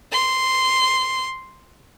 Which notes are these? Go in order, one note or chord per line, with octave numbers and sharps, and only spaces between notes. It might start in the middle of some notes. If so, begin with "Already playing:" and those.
C6